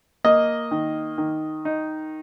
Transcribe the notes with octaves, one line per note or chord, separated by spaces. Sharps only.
A#3 D#5
D#3
D#3
D#4